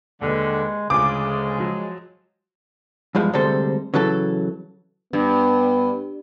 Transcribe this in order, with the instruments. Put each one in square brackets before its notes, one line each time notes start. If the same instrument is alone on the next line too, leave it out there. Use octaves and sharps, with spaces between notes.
[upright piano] D#2 B4 [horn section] D3 [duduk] G#3
[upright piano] D2 F4 G#5 [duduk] C#3 [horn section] G#3 [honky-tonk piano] D6
[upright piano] F3 F#3
[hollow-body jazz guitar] E2 G2 F3 G#3
D2 C3 G3 G#3 A4 C5
C#3 E3 F#3 A4
[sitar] G2 [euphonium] B3